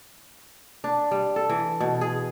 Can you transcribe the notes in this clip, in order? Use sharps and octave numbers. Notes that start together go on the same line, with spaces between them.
D4
G3
A4
E3
B2
G#4